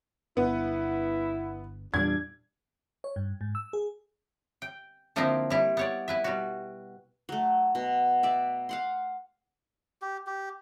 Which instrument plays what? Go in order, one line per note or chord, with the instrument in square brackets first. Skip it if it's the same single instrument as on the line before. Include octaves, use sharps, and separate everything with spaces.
[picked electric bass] G1 [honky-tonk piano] B3 [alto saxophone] E4
[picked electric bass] E2 A#2 G3 [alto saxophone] D4 [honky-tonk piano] G#6
[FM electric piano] C#5
G2
G#2
E6
G#4
[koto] G5
D3 F3 A#3 C4 D#4 E4
G3 E4
B3 C#5 D5
E4 B4 E5
B2 G3 F#4
[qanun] F#3 A3
B2
D5 E5
F5 F#5 C6
[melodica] G4
G4